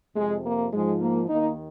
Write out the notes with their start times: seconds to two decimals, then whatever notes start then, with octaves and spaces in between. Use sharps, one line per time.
0.15 F2 C3 F3 G#3
0.44 A#3
0.72 G#2 F3 G#3
1.01 A#3
1.28 D#2 D#3 A#3 D#4